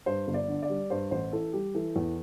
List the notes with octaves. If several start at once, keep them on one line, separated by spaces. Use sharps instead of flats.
G2 C5
G1
D5
D3
D5
G3
G2 C5
A1 C5
E3 A4
G3 G4
E3 A4
E2